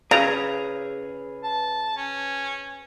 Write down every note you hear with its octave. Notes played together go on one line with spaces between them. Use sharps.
C#3 G#4 B4 A#5
A5
C#4